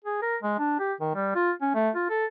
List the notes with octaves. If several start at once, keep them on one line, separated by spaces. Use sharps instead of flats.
G#4
A#4
G#3
D4
G4
D#3
G3
F4
C#4
A3
F4
A4